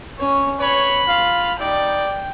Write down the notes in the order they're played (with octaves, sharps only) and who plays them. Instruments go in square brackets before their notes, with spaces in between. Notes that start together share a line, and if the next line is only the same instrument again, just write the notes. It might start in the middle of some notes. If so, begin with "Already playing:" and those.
[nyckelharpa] C#4 C#5
[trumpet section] B4 C#5 [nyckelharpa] B5
[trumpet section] F4 F5
[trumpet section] G3 D#4 D5 [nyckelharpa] G5